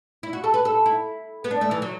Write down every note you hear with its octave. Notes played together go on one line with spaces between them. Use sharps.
E4
F#4
A4
B4
A4
E4
B3
D4
A3
E3
F#3